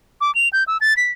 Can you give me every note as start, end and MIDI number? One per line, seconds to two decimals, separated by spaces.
0.21 0.34 86
0.35 0.48 101
0.53 0.64 91
0.67 0.77 88
0.81 0.96 93
0.97 1.12 95